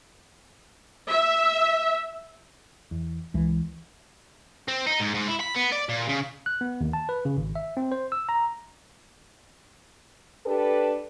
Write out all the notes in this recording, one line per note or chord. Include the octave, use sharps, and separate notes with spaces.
E5
E2
C#2 E3
C4
D#4
G#2
G#2
E4
B5
B3
D5
A#2
C#3
F#6
B3
D#2
A5
B4
C#3
G#1
E5
C4
C5
E6
A#5
D4 G4 A4 B4